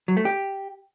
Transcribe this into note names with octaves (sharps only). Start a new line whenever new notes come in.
F#3
A3
G4